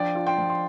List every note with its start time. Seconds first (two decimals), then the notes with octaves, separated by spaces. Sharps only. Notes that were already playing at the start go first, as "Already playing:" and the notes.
Already playing: F3 D4 D5 G5
0.15 F4
0.27 G5 C6
0.38 F3
0.50 C6